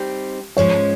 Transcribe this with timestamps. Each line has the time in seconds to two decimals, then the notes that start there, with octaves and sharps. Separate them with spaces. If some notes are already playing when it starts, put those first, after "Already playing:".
Already playing: G3 C4 D#4
0.57 G#2 F3 G#3 C#4 C#5